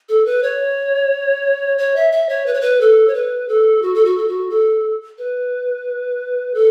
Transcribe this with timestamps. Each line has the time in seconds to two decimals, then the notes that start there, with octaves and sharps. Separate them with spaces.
0.09 A4
0.26 B4
0.43 C#5
1.78 C#5
1.96 E5
2.12 E5
2.29 C#5
2.46 B4
2.54 C#5
2.61 B4
2.81 A4
3.08 C#5
3.14 B4
3.49 A4
3.82 F#4
3.94 A4
4.05 F#4
4.17 A4
4.28 F#4
4.50 A4
5.18 B4
6.54 A4